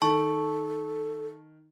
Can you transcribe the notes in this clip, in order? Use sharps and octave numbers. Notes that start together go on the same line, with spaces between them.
D#3 A4 A5 C#6